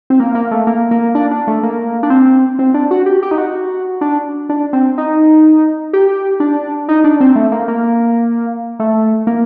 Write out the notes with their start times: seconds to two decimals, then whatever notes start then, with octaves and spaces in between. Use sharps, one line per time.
0.10 C4
0.20 A#3
0.35 A#3
0.51 A3
0.67 A#3
0.91 A#3
1.15 D4
1.31 D4
1.47 A3
1.63 A#3
2.03 D4
2.10 C4
2.59 C4
2.74 D4
2.91 F#4
3.06 G4
3.23 G4
3.31 D#4
3.38 F#4
4.01 D4
4.49 D4
4.73 C4
4.98 D#4
5.93 G4
6.40 D4
6.88 D#4
7.04 D4
7.20 C4
7.36 A3
7.52 A#3
7.68 A#3
8.80 A3
9.27 A#3